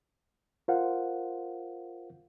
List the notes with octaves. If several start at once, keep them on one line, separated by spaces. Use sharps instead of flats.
F4 A#4 C5 F5 F#5